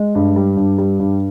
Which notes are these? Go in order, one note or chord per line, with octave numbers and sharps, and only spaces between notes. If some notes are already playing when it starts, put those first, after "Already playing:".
Already playing: G#3
G2
G3
G2
G3
G2